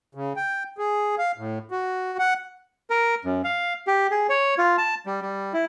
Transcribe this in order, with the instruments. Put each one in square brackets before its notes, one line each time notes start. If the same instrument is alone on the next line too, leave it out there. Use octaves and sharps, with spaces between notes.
[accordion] C#3
G5
G#4
F5
A2
F#4
F#5
[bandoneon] A#4
F#2
F5
G4
G#4
C#5
F4
A5
G3
G3
E4